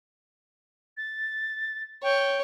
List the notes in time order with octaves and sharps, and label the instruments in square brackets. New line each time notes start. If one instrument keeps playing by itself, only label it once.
[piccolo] A6
[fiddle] C#5 [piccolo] G5